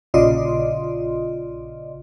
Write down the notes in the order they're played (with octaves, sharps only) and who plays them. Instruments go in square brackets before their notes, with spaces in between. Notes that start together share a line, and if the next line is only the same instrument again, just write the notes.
[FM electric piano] A#1 C#3 F4 D5 D#5 C6